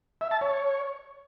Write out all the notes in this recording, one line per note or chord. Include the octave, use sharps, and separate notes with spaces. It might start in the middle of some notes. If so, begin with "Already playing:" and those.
E5
A5
C#5